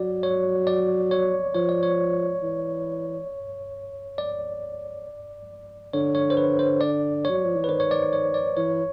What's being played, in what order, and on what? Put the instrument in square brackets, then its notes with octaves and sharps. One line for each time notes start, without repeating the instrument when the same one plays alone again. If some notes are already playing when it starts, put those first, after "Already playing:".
Already playing: [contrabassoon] F#3 [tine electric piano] D5
[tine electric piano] C#5
D5
C#5
[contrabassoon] F3 [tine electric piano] C#5
[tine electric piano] D5
C#5
[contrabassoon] E3
[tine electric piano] D5
[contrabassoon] D3 [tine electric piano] C#5
[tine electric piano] C#5
C5
B4
C5
D5
C#5
[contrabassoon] F#3
F3
E3
[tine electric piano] B4
[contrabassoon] D#3 [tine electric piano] C5
[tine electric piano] C#5
D5
C#5
D5
[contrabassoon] E3 [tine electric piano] C#5